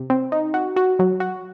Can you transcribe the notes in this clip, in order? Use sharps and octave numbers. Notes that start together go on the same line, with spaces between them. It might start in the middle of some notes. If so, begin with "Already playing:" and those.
Already playing: C3
C4
D#4
F#4
F#4
F#3
F#4